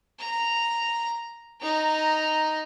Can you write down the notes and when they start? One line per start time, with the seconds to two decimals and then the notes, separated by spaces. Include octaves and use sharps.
0.19 A#5
1.61 D#4 A#5